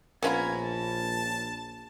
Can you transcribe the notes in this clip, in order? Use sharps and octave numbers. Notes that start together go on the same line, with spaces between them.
A#1 A#3 B3 C#4 F4 A#5 B5 G#6
A5